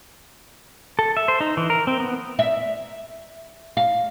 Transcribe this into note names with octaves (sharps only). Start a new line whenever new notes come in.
A4
E5
C5
D#4
E3
A#4
C4
B3
E5
F5